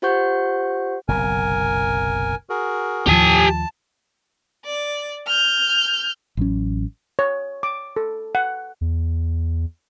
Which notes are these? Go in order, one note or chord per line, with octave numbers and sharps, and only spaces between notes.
F4 G4 C5 F#5 C#6 G6
F#1 B1 C3 A#4 G#5
F#4 G#4 A#4
D#2 A2 F3 G4 G#5 A5
D5
F6 G6
A1 F#3 C#4
C#5
D6
A4
F#5
E2